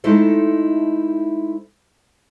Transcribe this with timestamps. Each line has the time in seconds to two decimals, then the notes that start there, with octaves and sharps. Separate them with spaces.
0.04 G#3 A3 D#4 E4 A4 C5